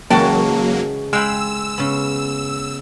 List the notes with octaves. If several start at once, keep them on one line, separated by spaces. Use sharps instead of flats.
C#3 E3 F#3 G#3 A#3 F#4 G5 A5
G#3 F5 G5 B5 E6
C#3 B3